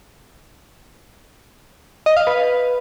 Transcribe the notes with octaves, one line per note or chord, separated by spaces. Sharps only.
D#5
F5
B4